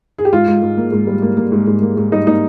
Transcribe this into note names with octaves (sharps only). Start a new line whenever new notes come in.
G#4
G4
G#2 F4
G#2
G#2
A#3
G#2
G3
A#3
A#3
G#2
G#2
A#3
G#2
G3 D#4
A#3 D#4